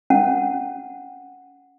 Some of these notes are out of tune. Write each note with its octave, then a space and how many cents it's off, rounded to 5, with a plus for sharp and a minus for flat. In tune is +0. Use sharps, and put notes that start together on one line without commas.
C#4 +15 F#5 -10